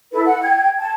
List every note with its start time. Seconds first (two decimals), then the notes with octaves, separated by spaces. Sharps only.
0.12 E4 A4 B4
0.26 F#5
0.43 G5 G#6
0.78 A5